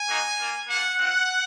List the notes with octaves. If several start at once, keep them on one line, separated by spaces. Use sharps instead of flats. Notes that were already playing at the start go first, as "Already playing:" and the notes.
Already playing: G#5
A#3 D#4 F#4
A#3 F4
A#3 F4 F#5
C4 F4 F#5